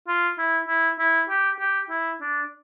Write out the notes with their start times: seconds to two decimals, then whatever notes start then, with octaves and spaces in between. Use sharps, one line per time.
0.07 F4
0.38 E4
0.68 E4
0.99 E4
1.29 G4
1.59 G4
1.90 E4
2.21 D4